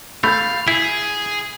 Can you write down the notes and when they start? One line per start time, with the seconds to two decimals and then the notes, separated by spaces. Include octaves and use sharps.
0.24 A3 F5 B5 G6 A6
0.68 E4 G#4